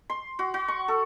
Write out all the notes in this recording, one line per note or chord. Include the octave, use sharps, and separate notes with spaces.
C6
F#4
F#4
C#6
A4